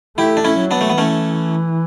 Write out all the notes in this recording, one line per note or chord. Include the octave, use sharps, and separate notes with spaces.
A3 E4 G4
D4
C#4 E4
F#3
B3 D4
A3
B3
E3 A3 C#4